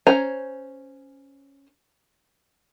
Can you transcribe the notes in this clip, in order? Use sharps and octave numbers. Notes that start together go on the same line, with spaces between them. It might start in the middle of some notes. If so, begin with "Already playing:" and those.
C#4 C5 G#5 A#5